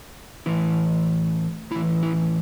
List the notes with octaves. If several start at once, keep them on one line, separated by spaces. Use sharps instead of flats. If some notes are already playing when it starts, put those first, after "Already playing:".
A2 E3 E4
A2 E3 E4
E4